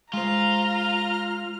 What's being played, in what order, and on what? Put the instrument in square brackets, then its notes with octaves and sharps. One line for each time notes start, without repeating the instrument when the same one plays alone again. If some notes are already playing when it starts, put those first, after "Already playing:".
[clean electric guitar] G#3 C5 [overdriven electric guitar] F4 [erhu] A#5 [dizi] F6